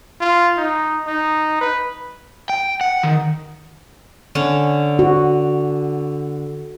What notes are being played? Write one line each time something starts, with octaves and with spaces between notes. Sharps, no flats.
F4
D#4
D#4
B4
G5
F#5
D#3
D3 C#4
F#4